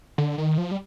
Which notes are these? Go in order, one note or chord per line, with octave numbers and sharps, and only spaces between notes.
D3
D#3
F3
G3